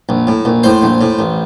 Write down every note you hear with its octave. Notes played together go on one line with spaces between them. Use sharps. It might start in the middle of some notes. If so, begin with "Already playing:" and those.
A#1
A2
A#1
A2 C5
A#1
A2
A1